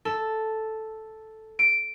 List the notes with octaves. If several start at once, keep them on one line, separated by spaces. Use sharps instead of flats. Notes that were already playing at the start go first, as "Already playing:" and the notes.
A4
D7